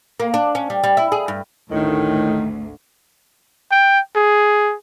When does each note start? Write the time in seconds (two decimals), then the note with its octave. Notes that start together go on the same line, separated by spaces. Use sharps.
0.20 A#3
0.34 D4
0.55 C#4
0.70 G3
0.84 G3
0.97 E4
1.12 G#4
1.28 G2
1.71 G#1 D2 A2 D#3
3.71 G5
4.16 G#4